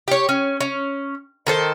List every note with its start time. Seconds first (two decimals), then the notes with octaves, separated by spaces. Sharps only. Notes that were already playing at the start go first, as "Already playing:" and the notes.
0.08 G4 C#5
0.29 C#4
0.61 C#4
1.47 D#3 A4 C5